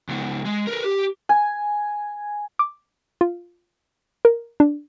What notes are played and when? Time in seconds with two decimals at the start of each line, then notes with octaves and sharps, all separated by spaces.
0.09 C#2 B3
0.45 G#3
0.67 A#4 B4
0.84 G4
1.29 G#5
2.59 D6
3.21 F4
4.25 A#4
4.60 D4